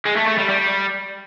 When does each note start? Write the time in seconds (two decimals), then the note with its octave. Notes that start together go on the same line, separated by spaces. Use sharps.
0.05 G#3
0.16 A3
0.27 A3
0.38 G3
0.49 G3